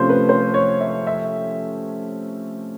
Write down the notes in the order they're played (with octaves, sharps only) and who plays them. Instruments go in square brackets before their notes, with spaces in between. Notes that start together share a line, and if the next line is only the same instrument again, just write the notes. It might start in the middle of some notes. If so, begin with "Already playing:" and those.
Already playing: [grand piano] C3 F3 A3 C#4 [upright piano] C5 C#5
[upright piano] B4
C5
C#5
E5
E5